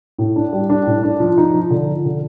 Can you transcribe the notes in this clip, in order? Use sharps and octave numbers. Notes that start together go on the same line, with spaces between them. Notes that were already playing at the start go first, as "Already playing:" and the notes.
A2
D4
G3
D4
A2
D4
F3
D#4
F3
D3
F3
D3